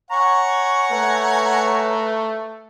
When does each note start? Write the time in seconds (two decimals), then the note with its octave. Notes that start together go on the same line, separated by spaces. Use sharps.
0.11 C#5 F#5 G#5 A#5 C#6
0.91 A3 B4